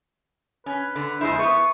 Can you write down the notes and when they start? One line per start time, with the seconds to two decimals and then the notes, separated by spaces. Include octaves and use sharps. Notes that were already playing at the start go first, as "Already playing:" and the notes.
0.66 C#4 B4
0.95 D3
1.21 F2 G#3 E4 C5
1.39 B3 B4 C#6